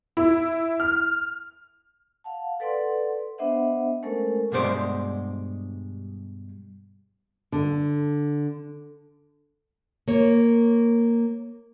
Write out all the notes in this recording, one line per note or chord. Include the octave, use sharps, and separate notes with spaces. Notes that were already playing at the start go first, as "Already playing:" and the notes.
E4
F6
F5 F#5 A5
A4 B4 D5 F#5 C6
B3 D4 C5 D#5 E5 F#5
G#3 A3 C#4 A4 A#4 C5
G2 B2 G#3 C5 D5
D3
A#3 C#5